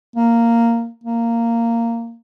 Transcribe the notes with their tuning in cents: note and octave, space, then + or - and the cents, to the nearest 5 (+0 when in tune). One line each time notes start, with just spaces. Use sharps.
A#3 -5
A#3 -10